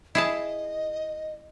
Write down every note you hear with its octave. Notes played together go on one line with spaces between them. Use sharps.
E4 G#4 D#5 A5